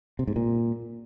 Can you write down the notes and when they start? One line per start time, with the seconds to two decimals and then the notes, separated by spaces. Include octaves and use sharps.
0.19 C3
0.27 G#2
0.36 A#2